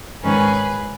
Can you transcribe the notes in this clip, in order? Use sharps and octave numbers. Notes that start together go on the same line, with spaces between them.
G#2 D#3 G#3 C#4 G#4 B4